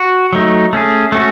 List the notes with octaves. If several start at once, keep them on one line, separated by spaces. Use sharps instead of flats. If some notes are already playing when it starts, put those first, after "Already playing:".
Already playing: F#4
F#3 A3 D#4
A3 C#4 G#4
A3 C#4 F#4